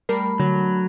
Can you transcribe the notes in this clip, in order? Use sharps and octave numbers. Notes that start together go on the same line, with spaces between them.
G3 A3 A#4 B5
D3 F#3